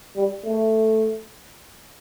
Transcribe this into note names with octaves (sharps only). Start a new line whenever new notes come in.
G3
A3